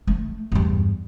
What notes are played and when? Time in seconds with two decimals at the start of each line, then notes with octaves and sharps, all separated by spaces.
0.07 A3
0.52 E2 G2